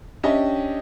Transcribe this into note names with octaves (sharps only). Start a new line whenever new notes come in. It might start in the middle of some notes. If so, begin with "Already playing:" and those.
C#4 D4 G4 D#5 E5 G5